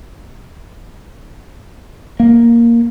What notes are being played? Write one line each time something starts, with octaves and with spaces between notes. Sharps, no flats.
A#3